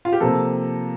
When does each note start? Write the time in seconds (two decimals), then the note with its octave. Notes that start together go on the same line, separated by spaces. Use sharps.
0.05 F4
0.13 G4
0.20 C3 F3 A#3 A4